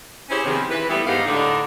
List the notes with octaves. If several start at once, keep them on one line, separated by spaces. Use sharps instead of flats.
C#4 E4 G4 G#4 C5 C#5
C3 D#3 F3 B3 C4 G#4
E3 B4
E3 G3 A3 B3 E4
G#2 B3 D#4 G4 A#4 F5
A2 D3 D4 D#4